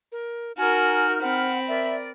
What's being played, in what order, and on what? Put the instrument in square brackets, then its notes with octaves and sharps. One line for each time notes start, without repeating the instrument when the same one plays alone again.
[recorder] A#4
[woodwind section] D#4 F6 [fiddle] F#4 A#4 [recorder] G#5
[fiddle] C4 B5 [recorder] F#5
[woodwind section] A#4 D5 [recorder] E5